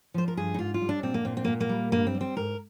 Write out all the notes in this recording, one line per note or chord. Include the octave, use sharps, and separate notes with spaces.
F3 C5
A#4
G2 G#4
D#4
G#2 F4
F4
G3
D4
A#2 C4
A#3
A#2 C4
C4
A#3
A#2
A#3
G3
G2 A#3
C4
G3
C4
G#2 A#4